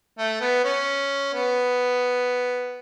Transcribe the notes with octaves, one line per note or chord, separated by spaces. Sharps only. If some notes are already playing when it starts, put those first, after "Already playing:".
A3
B3
C#4
B3